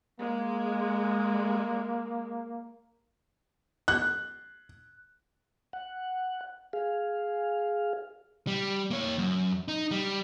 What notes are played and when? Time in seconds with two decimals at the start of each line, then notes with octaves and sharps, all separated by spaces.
0.20 G#3 A#3
3.88 F#6
5.73 F#5
6.73 G#4 F5
8.47 G3
8.91 A#3 C#5
9.18 F#2
9.68 D#4
9.91 G3